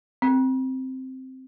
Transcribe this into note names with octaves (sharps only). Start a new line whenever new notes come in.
C4